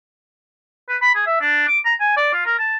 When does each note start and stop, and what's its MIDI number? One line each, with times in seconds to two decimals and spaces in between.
0.89 0.97 71
1.02 1.14 83
1.15 1.24 68
1.26 1.40 76
1.41 1.64 62
1.68 1.79 86
1.85 1.94 82
2.00 2.14 80
2.17 2.29 74
2.34 2.44 65
2.46 2.55 70
2.59 2.77 81